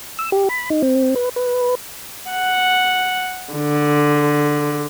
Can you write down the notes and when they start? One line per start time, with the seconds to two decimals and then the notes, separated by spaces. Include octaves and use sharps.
0.19 E6
0.32 G4
0.49 B5
0.70 D#4
0.82 C4
1.16 B4
1.36 B4
2.31 F#5
3.53 D3